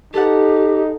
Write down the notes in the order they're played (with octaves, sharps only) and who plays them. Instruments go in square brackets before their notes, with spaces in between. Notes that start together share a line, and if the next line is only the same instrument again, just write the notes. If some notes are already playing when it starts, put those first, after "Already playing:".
[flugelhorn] D#4 [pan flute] G4 [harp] A4 B4 F#5